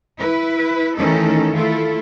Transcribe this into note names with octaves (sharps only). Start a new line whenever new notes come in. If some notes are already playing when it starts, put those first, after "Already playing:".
E4 B4
D#3 E3 A3 C#4 D#4 A4
A3 E4 F4 A4